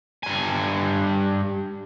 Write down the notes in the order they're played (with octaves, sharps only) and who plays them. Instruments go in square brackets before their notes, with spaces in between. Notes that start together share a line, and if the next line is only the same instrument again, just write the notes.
[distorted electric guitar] G2 G#5